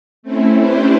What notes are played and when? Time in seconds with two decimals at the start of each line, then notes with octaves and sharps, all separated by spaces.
0.23 A3 C4 C#4 E4
0.57 C#4 D4 E4 G4 B4 C5